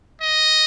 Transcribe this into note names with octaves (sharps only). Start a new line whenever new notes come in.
D#5